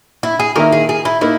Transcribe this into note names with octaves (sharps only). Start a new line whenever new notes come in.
E4
G#4
D#3 A#3 E4 A#4
G#4
G#4
E4
A#3 D#4 E4